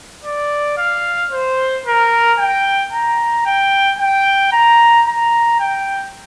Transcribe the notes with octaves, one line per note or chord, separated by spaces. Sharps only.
D5
F5
C5
A#4
G5
A#5
G5
G5
A#5
A#5
G5